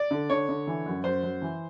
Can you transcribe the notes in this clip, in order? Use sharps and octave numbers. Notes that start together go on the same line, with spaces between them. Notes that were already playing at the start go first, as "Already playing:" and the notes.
Already playing: D5
D3
D3 C#5
D3
E3
F#2
F#2 C5
F#2
E3